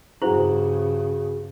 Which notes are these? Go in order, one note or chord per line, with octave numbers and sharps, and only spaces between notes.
G2 C#3 E4 F#4 G#4 C5